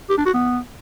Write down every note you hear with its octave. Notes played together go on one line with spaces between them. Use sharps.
G4
D4
F#4
B3